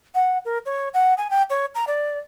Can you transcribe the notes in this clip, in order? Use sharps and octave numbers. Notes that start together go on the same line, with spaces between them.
F#5
A#4
C#5
F#5
G#5
G5
C#5
A#5
D5